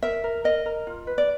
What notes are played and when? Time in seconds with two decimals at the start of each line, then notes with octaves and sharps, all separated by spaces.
0.02 A#4 E5
0.24 A#4
0.44 A#4 D#5
0.66 A#4
0.87 F4
1.07 B4
1.18 D5